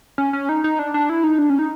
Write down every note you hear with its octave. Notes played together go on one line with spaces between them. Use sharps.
C#4
C#4
D#4
D#4
D4
D4
E4
D#4
D4
C#4
D#4